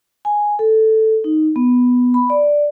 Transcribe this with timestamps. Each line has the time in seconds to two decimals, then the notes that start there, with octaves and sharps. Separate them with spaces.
0.25 G#5
0.59 A4
1.24 D#4
1.56 B3
2.14 B5
2.30 D5